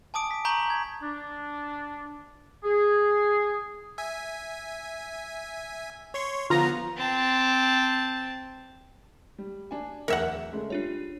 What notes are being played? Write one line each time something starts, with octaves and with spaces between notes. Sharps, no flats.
G#5 A5 D6 D#6 D7
B6
G#5 A#5 C#6 G6 B6 F#7
G#6
D4
G#4
E5 G#5
C#5 C6 C#6
D3 F3 B3 F4 A#5
C4 A5
G3
D4 G#5
D1 E2 A#4 E5 F#5 C#7
C#3 G#3 A3
G3 D4 F4 C#5